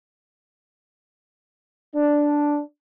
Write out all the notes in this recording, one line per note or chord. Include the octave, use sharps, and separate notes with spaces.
D4